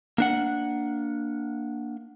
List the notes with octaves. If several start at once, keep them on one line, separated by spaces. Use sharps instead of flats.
A#3 D4 F#5